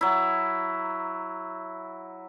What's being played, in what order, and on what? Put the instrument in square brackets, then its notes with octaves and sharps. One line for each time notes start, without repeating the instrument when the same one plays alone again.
[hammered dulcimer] F#3 E4